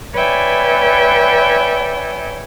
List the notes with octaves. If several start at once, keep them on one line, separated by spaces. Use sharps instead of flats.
B4 C#5 D5 E5 G5 G#5